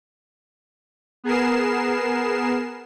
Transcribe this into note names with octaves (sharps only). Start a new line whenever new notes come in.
B3 G#4 A#4 C7 E7